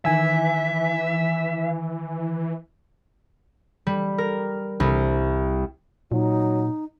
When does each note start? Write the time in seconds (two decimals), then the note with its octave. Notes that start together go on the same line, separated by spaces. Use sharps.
0.05 D#3 E3 E5 G#5 E6
3.87 G3
4.18 A#4
4.80 C2
6.12 A#2 F#3 D#4